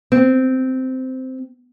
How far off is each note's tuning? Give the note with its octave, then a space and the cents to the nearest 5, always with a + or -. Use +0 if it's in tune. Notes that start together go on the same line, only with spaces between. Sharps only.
C4 -10